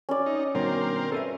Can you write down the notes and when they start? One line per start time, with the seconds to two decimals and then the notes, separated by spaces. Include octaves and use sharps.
0.09 C#4 D5
0.26 D#4
0.55 G2 B2 D#3 C4 A#4
1.12 A4 B4 E5